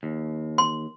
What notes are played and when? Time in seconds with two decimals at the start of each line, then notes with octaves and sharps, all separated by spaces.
0.03 D#2
0.58 C6